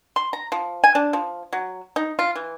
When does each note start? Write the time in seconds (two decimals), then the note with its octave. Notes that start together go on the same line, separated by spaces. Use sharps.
0.16 C6
0.33 A#5
0.52 F3
0.84 G#5
0.95 D4
1.13 F3
1.53 F#3
1.96 D#4
2.19 F4
2.35 E3